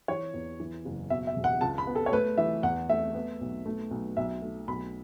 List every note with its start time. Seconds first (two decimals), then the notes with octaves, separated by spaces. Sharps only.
0.08 E3 C#5
0.34 E2
0.60 E3
0.85 F#1
1.10 B2 E5
1.27 E5
1.36 E1
1.44 F#5
1.61 C#2 A5
1.78 B5
1.87 B3
1.95 A4
2.06 C#5
2.12 A3 B4
2.37 E3 E5
2.63 E2 F#5
2.89 A3 E5
3.15 B3
3.41 B1
3.66 A3
3.91 B1
4.17 B1 E5
4.42 A3
4.68 B1 B5